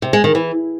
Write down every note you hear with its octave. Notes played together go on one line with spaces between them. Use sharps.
C3
G#3
D#3
E3